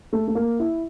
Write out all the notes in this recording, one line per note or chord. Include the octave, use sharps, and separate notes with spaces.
A3
A3
A#3
E4